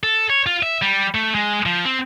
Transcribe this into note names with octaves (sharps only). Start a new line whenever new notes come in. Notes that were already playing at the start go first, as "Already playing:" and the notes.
A4
C#5
F4
E5
G3
A3
G#3
F3
C4